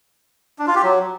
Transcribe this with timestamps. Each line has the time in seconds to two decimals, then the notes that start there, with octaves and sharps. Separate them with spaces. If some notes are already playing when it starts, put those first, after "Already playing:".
0.59 D4
0.67 F4
0.75 G4
0.83 F#3